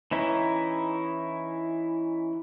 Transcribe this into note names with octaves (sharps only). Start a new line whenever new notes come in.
E3 C#4 D#4 E4